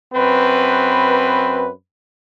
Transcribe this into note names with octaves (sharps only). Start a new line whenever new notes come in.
F#2 C4 B4